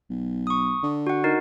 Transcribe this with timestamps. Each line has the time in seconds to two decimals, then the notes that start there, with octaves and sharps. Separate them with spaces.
0.10 B1
0.47 C#6 D#6
0.83 D3
1.07 F#4 F#5
1.24 D#4 F#4 A#4